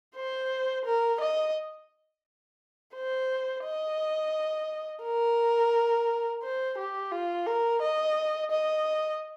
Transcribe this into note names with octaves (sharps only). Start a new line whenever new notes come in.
C5
A#4
D#5
C5
D#5
A#4
C5
G4
F4
A#4
D#5
D#5